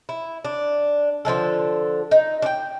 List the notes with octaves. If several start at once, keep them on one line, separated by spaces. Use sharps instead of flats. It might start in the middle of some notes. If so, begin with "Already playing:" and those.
E4
D4
D3 F3 G#3 A4
D#4
D4 G5